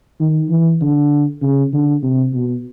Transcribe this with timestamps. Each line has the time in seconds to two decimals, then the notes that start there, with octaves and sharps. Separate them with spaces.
0.20 D#3
0.50 E3
0.81 D3
1.42 C#3
1.73 D3
2.03 C3
2.34 B2